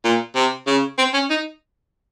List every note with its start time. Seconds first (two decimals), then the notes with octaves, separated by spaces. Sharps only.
0.04 A#2
0.35 C3
0.67 C#3
0.98 C4
1.14 C#4
1.30 D#4